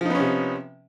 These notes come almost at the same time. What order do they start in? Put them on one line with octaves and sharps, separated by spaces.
F3 D#4 B3 C#4 C3